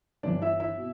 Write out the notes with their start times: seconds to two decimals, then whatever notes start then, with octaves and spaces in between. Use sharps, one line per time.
0.23 G1 G2 E3 D4 D5
0.42 E4 E5
0.60 E4 E5
0.78 B2